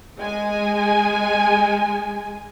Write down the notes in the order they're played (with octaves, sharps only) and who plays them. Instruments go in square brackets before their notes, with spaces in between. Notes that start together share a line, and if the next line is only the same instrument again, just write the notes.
[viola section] G#3 G#5